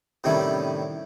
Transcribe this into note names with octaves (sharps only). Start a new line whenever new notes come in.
A2 C3 D#3 G3 C#4 E4